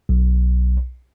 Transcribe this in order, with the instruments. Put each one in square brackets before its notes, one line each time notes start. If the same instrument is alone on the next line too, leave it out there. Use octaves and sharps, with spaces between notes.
[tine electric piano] B1